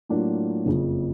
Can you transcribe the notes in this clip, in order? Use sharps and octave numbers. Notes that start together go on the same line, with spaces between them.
A2 F#3 A#3 D4 F4
F#1 F2 C#3 F3